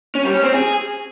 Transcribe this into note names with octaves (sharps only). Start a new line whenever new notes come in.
C#4
G3
C#4
C4
G#4